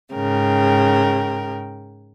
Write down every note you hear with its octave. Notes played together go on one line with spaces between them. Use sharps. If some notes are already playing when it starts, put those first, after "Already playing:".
G#2 C#3 A#4 G5